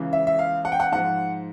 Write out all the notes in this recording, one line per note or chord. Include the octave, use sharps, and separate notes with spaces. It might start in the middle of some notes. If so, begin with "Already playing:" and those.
Already playing: C#2 C#3 E3
E5
E5
F5
F#5
G5
F#5
G#2 F3 F#5